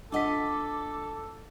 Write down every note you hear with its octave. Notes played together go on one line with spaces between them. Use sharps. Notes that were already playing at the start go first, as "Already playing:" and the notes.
D4 F4 A4 D#5 F#5 D6 B6